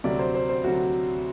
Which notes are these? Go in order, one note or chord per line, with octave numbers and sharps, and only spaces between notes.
D2 C3 F#3 D5
C5
C5
C5
D2 C3 F#3 F#4